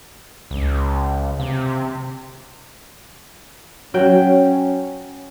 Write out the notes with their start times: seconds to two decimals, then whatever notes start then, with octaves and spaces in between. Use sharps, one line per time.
0.51 C#2
1.40 C3
3.94 F#3 C#4 G5